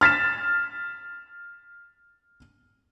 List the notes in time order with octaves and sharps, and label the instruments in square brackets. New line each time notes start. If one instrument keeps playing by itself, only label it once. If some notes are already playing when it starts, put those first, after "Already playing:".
[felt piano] F6 A6 B6 E7